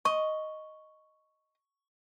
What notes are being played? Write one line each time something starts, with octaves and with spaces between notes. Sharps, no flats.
D#5 C#6